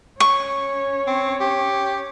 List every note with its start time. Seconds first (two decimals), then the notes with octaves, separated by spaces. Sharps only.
0.20 C#4 C#5 C#6
1.07 C4
1.40 G4